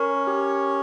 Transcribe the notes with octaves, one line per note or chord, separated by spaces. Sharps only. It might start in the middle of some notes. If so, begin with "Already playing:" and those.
Already playing: C#4 A#4 C#5
G4